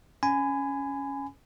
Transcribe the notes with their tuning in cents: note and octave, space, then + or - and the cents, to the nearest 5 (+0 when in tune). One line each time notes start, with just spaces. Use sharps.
C#4 +0 G#5 +0 B5 +30